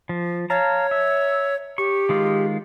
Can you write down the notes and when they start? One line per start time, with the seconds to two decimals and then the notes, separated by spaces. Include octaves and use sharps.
0.09 F3
0.50 C#5 F5 A5 A#5
0.91 E5
1.78 G4 C#6
2.09 D#3 G#3 F4